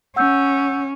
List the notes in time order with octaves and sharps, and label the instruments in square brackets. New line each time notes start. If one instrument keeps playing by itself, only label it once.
[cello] C#4 [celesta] F#5 E6 G6